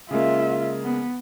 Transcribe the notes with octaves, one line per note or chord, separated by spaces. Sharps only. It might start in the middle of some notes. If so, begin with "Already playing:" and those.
C#3 G#3 A#3 F4 E5
B3